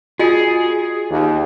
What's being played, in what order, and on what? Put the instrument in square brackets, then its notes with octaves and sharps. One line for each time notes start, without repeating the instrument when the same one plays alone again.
[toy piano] F4 D#5 G#5 [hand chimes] F#4 D#6 [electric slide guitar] G#4
[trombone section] D#2